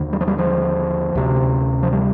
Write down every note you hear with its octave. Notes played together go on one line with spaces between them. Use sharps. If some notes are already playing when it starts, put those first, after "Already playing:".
Already playing: D#2 D3
G3
F3
G3
F3
D2 C3
F3
G3